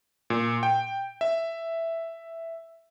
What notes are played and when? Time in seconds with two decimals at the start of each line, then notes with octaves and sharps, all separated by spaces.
0.30 A#2
0.63 G5
1.21 E5